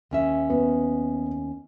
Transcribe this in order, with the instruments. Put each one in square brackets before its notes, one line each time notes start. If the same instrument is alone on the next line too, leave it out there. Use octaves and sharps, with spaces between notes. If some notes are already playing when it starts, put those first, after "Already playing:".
[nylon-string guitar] D#2 C#4 E5
[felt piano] B3